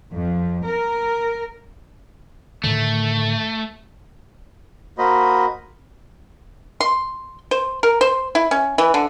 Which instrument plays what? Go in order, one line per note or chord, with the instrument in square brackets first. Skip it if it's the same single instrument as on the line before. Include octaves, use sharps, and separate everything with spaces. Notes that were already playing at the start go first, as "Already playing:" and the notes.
[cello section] F2
A#4
[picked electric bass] A2 D3 D#3 [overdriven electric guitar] A3
[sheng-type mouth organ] A#3 F#4 C5 D#5 B5
[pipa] C6
C5
A#4
C5
E4
C#4
E3
D3